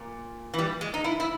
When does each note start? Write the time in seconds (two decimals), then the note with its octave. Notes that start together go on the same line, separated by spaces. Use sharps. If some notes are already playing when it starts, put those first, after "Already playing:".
Already playing: A#2
0.54 E3
0.59 G3
0.81 G#3
0.94 D#4
1.04 E4
1.20 E4